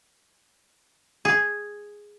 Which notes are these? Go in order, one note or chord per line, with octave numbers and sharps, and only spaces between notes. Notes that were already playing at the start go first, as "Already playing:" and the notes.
G#4